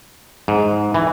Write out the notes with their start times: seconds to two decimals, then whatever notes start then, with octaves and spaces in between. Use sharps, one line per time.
0.48 G#2
0.94 E3